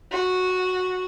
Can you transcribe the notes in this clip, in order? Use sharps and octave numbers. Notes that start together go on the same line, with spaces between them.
F#4